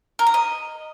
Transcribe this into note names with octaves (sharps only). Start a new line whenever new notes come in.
A#4
A#5
D#5